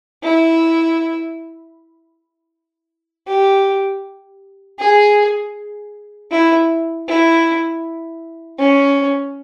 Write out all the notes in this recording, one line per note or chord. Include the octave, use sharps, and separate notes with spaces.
E4
G4
G#4
E4
E4
C#4